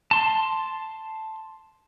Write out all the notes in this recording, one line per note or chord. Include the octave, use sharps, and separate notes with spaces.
A5 C6